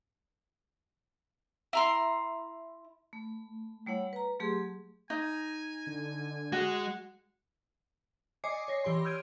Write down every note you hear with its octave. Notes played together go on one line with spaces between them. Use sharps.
E4 A#5 C6
A3
G3 A3 E4 C#5 F#5
B4 A#5
F#3 A3 G4 G#4 C6
D#4 G#5
D3
G#3 F#4 F#5
D5 D#5 G#5 D6 C7 C#7
C#5 A#6 C7
E3 G4 C#5 C6
E6 F6 G6 G#6 D7 D#7